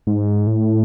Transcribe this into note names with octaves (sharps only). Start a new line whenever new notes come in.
G#2
A2